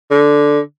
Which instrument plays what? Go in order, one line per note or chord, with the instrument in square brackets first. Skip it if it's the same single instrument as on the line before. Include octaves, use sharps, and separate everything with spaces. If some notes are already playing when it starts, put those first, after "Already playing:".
[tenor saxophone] D3